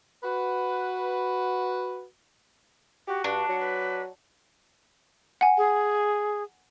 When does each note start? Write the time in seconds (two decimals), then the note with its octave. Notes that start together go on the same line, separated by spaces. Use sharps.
0.24 F#4 B4
3.08 F#4 G4
3.24 G2 D4
3.49 F#3 F#5
3.60 B4
5.41 F#5 G#5
5.58 G#4